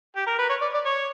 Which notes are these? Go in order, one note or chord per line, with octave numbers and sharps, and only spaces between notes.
G4
A#4
B4
C#5
D5
D5
C#5